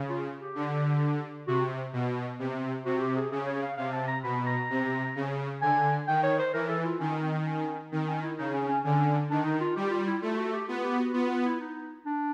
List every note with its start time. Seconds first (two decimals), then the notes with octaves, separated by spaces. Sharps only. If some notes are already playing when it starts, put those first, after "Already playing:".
Already playing: C#3
0.10 F4
0.40 G4
0.55 D3
1.47 C3 F#4
1.93 B2
2.39 C3
2.85 C3 F#4
3.01 G4
3.16 G#4
3.32 C#3 G#4
3.47 C#5
3.63 F5
3.77 C3 F5
3.93 A5
4.08 A#5
4.23 B2 B5
4.47 A#5
4.70 C3
5.16 C#3
5.62 D3 G#5
6.08 D#3 G5
6.24 C#5
6.39 C5
6.54 E3 A#4
6.69 A4
6.85 F4
7.00 D#3 C#4
7.23 C4
7.46 C#4
7.92 D#3 C4
8.07 C#4
8.22 E4
8.38 C#3 D#4
8.53 C#4
8.68 C#4
8.84 D3 C#4
9.30 D#3 D4
9.45 D#4
9.61 F4
9.76 G3 G4
9.91 F4
10.07 E4
10.22 A3 F4
10.37 F#4
10.53 G4
10.68 B3 F4
10.84 G4
10.99 F#4
11.14 B3 F4
11.30 F4
11.45 E4
11.60 D#4
12.06 D4